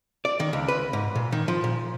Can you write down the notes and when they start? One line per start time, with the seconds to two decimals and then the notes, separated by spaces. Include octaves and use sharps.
0.25 D5
0.40 D#3
0.53 C#2
0.68 B4
0.93 G#2
1.15 A#2
1.32 D#3
1.48 F3
1.64 A#2